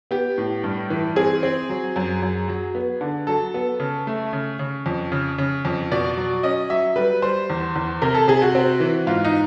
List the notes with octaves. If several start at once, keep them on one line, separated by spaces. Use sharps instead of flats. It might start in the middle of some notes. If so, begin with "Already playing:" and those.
B3 G4
A2
G2
E3
C4 G#4
C4
F#3
F#2
F#2
F#3
B3
D3
F#3 A4
B3
C#3
A3
C#3
C#3
F2
C#3
C#3
F2
B2 D5
F#3
C#4 D#5
F#3 E5
G3 B4
G3 C5
E2
E2
C3 A#4
A4
C3 G#4
F#4
C4
E3
G#2 F4
D#4